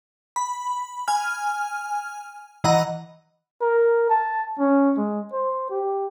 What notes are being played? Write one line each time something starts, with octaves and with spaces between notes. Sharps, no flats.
B5
G#5 F6
E3 D#5 F#5 A#5
A#4
A5
C#4
G#3
C5
G4